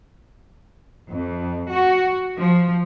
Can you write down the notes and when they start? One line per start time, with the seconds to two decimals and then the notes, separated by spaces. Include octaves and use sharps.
1.12 F2
1.72 F#4
2.38 F3